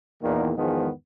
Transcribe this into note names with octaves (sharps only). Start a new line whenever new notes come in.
E2 A#2 D#3
E2 G#2 D#3 F3 G#3 B3